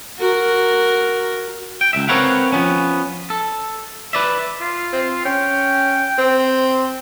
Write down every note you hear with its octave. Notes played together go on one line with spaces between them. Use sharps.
F#4 A#4
G5
C#2 G#2 E5
C4 A#4 B4 C#5 F5 F#5
F3 B3 C#4
A4
B4 D5 E5
F4
C4
C#4 G5
C4